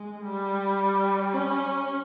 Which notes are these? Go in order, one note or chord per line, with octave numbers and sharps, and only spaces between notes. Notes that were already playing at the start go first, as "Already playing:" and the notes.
Already playing: G#3
G3
C#4